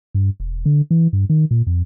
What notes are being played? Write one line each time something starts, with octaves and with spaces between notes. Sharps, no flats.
G2
E1
D3
E3
G2
D#3
A#2
F2